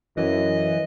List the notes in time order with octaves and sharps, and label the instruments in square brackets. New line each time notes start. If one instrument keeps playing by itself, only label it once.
[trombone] F#2 [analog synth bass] E3 [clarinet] D#5